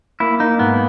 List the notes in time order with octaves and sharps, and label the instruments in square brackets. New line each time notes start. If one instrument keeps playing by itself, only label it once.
[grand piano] A#3 [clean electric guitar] E4
[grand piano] A#3 [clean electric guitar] D#4
[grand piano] G#2 [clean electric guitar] B3